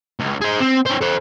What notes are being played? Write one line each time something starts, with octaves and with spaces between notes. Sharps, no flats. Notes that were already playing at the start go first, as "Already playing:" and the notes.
C#2
G#4 C5
C4
C#4 C5
A4 C5